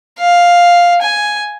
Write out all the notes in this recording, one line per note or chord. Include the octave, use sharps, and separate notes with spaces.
F5
G#5